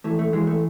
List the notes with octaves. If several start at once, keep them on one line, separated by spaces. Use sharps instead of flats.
E3 A3
A3
E3 G#3
A3